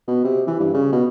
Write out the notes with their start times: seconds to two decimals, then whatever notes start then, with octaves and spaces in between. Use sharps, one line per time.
0.08 B2
0.25 C3
0.47 E3
0.60 G2
0.74 C#3
0.93 B2